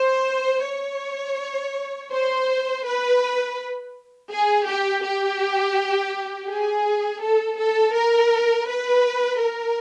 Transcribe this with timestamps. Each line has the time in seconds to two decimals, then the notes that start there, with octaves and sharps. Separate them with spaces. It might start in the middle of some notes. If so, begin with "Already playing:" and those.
Already playing: C5
0.67 C#5
2.12 C5
2.85 B4
4.31 G#4
4.66 G4
5.03 G4
6.49 G#4
7.22 A4
7.58 A4
7.95 A#4
8.68 B4
9.40 A#4